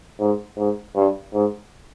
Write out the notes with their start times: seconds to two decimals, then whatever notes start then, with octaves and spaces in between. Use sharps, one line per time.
0.20 G#2
0.58 G#2
0.95 G2
1.33 G#2